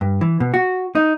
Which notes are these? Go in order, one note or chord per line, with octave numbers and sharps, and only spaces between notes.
G2
E3
B2
F#4
D#4